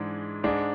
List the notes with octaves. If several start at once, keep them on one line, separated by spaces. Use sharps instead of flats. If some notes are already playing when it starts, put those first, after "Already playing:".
Already playing: G#2 E3 G#3 D4
G#2 G#3 D4